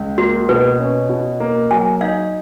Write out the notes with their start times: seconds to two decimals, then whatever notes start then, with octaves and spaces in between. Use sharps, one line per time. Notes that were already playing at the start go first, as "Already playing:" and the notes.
Already playing: C#2
0.18 A#3 F#4
0.49 B2 B4
0.79 C#4
1.09 B2
1.40 A#3
1.71 F#3 G#5
2.01 D#4 F5